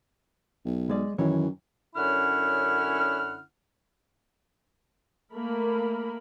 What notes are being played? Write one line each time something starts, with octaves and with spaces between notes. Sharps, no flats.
B1
G#3 D5
F#2 D#3 E3 C#5
F#2 D3 C#4 E4 F#5 F6
A3 A#3 A#4 B5